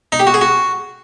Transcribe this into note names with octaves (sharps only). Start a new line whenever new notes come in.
D#4
G4
F#4
G#4
F#4